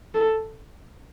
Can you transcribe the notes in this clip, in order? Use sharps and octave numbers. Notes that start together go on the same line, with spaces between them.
A4